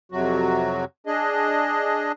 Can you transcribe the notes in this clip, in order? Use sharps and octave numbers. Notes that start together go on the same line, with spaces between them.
F2 C3 F#3 F#4
D4 G#4 D#5